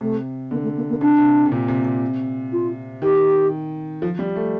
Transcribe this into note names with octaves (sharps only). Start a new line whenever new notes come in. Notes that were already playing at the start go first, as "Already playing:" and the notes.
C3 A3
D3 A#3
A3
A#3
A#3
C3 D4
C3
C3
A#2
C3
C3
F4
D#3 G4
F3
G3
A3